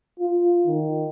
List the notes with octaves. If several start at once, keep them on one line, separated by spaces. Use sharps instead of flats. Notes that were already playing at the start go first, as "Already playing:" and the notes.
F4
D#3